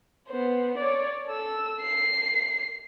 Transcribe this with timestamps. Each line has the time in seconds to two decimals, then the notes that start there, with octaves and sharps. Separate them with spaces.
0.29 B3 C5
0.77 C#5 D5
1.27 A4 E6
1.81 C7